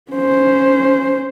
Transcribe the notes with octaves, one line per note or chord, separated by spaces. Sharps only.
C#4 C5